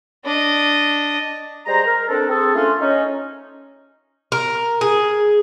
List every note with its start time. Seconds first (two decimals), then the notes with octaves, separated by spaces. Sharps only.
0.25 D4 D#5
1.66 G3 G#3 C5 A#5
1.84 A#4
2.08 C4 D4 A4
2.29 C4 G#4 A4
2.54 A3 A#3 C#4 D4 F4 C6
2.79 C#4 D#4
4.32 A#4
4.81 G#4